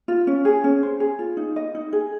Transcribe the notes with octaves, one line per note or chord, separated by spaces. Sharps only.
F4
C#4
G#4
C#4
C5
G#4
F4
D#4
D#5
D#4
G#4